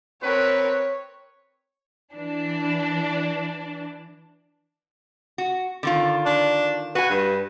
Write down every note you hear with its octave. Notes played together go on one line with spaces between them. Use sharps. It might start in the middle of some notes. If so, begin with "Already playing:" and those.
C4 A#4 B4 C#5
E3 D4
F#4
D3 D#3 F4
D4
F#4 B4 G#5
G2